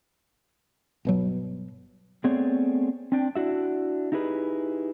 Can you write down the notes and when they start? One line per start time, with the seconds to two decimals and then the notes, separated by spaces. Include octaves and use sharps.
1.05 G1 B2 F#3
2.24 A3 B3 C4 G#4 C#5 D5
3.12 C4 D4 G5
3.35 D4 E4 F#4 E5
4.12 D#4 E4 G4 G#4 B4